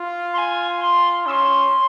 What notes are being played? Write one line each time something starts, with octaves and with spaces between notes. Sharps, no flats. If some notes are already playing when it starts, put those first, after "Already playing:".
Already playing: F4
C6
G#5
C6
C#4 C6 E6